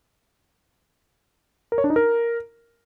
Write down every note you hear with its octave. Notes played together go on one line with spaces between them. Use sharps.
A#4
C#5
D4
D#4
A#4